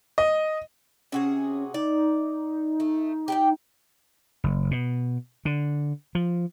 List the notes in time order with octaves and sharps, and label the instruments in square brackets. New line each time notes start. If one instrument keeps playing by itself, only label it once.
[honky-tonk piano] D#5
[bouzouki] C3 F#4 G#4 [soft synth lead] C#4
[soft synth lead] D#4 [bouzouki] D5
[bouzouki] A3
G4 D5 G5
[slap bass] F#1
B2
D3
F3